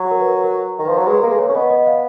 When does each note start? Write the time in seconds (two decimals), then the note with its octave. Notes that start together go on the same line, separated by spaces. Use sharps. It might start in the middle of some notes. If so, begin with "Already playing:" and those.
Already playing: F#3
0.11 A#4
0.20 B4
0.28 A#4
0.44 A#4
0.79 D#3
0.85 F3 B4
0.98 F#3
1.07 G#3 B4
1.19 A#4
1.23 A#3 B4
1.32 G#3
1.38 A#3 C#5
1.49 C#4
1.55 B3 D#5
1.70 D#5
1.87 F5